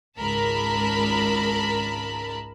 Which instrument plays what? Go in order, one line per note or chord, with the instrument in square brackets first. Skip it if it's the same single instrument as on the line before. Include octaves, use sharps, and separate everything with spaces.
[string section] G#1 C#2 A#4 A5 B5